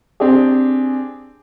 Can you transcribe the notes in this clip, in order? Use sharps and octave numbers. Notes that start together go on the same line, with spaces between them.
C4 D4 G4 G#4